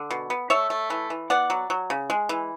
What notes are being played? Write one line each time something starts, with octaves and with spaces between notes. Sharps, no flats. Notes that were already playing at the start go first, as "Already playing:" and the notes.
Already playing: D3
B2
B3
A3 C#5 E5
A3
E3
E3
B3 D5 F#5
F#3
F#3
C#3
G#3
E3